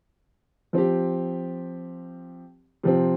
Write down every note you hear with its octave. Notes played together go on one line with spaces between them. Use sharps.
F3 C4 G4
C3 F3 C4